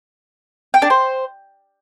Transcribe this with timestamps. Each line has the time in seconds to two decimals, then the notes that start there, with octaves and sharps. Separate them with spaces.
0.74 G5
0.82 D4
0.90 C5